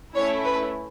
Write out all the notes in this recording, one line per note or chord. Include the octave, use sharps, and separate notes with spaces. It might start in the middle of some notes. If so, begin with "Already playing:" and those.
A3 C#4 E4 C#5
B4